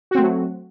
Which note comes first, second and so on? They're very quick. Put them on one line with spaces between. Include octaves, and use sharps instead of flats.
F#4 C4 A3 F#3